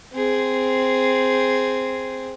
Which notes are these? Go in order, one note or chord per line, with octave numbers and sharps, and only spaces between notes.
C4 G#4